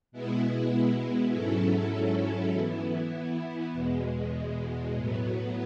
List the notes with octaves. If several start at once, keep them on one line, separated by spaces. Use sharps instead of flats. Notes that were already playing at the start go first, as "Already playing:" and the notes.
B2 G#3 B3 E4
G#2 F#3 C#4 E4 A4
E3 B3 E4
E2 B2 G#3
A2 F#3 B3